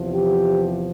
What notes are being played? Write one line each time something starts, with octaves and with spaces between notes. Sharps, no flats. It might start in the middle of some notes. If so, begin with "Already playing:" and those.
Already playing: E2 C3 F3
G4